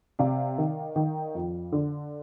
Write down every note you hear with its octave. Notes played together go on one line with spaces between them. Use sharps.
C3 D5 F5
D#3
D#3
F2
D3